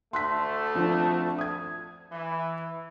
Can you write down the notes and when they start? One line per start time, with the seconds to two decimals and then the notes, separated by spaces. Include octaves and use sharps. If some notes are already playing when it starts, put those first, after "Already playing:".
0.13 D2 A3 C6 F#6 B6
0.75 F3 C4 D4
1.38 D#6 G#6
2.11 E3